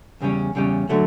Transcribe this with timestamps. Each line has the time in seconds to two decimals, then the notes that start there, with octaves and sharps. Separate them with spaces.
0.21 E2 C#3 G3 C#4
0.55 E2 C#3 G3 C#4
0.89 D3 F#3 A3